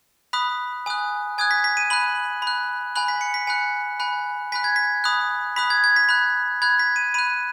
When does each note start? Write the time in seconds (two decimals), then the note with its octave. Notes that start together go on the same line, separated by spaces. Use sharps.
0.33 B5 D#6 F#6 B6
0.86 G#5 D#6 F#6
1.38 G#5 D#6 F#6 G#6
1.51 B6
1.64 B6
1.77 D#7
1.90 B5 F#6 F#7
2.42 B5 F#6
2.95 G#5 B5 F#6 F#7
3.08 B6
3.21 C#7
3.34 B6
3.47 G#5 B5 F#6 C#7
4.00 G#5 B5 F#6
4.52 G#5 B5 F#6 B6
4.64 G#6
4.76 B6
5.04 B5 D#6 F#6
5.56 B5 D#6 F#6 B6
5.70 G#6
5.84 G#6
5.96 B6
6.09 B5 F#6
6.62 B5 F#6 G#6
6.79 B6
6.96 D#7
7.14 B5 F#6 D#7